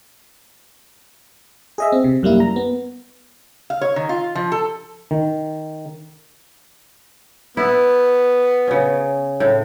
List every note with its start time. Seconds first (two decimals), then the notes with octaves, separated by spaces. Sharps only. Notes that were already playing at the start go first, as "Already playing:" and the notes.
1.78 G#4 D#5 E5
1.92 C4
2.04 C3
2.23 F#2 G3 A#3 E4
2.40 A#5
2.56 B3
3.70 F5
3.81 C#5
3.96 D#3
4.09 F4
4.35 F3
4.52 A4
5.11 D#3
7.57 B3 E4
8.67 C#3 C#4
9.40 A2